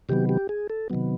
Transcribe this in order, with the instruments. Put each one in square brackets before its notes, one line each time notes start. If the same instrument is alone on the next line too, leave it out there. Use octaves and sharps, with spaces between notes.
[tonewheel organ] C3 D#3 F#3 B3 G4
G4
G#4
A4
C3 D#3 F#3 B3